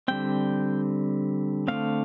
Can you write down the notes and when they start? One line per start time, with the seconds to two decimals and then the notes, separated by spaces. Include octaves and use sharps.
0.08 D3 G3 C4 G5
1.68 D3 A3 C4 F5